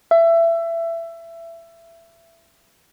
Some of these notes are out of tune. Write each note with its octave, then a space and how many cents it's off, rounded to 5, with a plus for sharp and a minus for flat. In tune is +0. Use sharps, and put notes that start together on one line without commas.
E5 +20